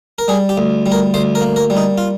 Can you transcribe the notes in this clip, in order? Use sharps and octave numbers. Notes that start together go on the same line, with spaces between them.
A#4
G3 G#4
G4
D2
G3
A#4
D2 C5
A#4
A#3
A#4
G3
D#4
F4